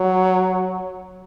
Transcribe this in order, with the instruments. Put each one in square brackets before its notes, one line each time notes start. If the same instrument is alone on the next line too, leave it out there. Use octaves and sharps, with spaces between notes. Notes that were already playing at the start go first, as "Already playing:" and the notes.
Already playing: [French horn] F#3